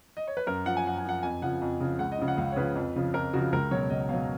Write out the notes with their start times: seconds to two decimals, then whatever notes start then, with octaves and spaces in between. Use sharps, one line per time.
0.17 D#5
0.27 C#5
0.37 B4
0.47 F#2 A#4
0.65 F3 F#5
0.77 G#5
0.86 F#2 F#5
0.98 G#5
1.05 F3 F#5
1.23 F2 G#5
1.42 C#3 F3 F#5
1.62 F2
1.81 C#3 F3
1.99 C#2 F#5
2.12 D#5
2.19 C#3 F3
2.28 F#5
2.37 C#2 F5
2.52 C#5
2.56 C#3 F3 B4
2.75 F2
2.96 C#3 F3
3.14 F2 A#4
3.33 C#3 F3 F#4
3.52 C#2 A#4
3.71 B2 F#3 C#5
3.90 C#2 D#5
4.09 B2 F#3 F5